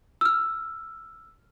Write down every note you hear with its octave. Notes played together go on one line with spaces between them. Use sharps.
E6 F6